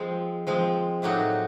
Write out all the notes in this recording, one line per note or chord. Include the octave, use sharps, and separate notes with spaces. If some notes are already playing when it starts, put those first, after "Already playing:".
Already playing: F3 G#3 C4
F3 G#3 C4
A2 F#3 A#3 D#4 F#4